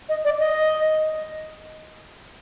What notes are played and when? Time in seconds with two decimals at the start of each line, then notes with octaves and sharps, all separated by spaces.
0.09 D#5
0.25 D5
0.39 D#5